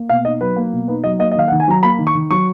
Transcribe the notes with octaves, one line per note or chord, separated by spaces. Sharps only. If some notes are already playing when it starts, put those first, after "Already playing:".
Already playing: A#3
B2 F5
D#4 D#5
F#3 B4
A#3
B2
D#4 B4
F#3 D#5
A#3 D#5
D#5
D#3 F5
F#5
D#3
G#5
F#3 A#5
A#3 B5
D#3
C#6
D#3
F#3 C#6